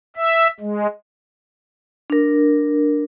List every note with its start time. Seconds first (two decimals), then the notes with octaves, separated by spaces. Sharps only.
0.16 E5
0.60 G#3
2.10 D4 A#4